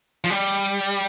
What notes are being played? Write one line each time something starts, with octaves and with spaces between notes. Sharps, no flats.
F3
G3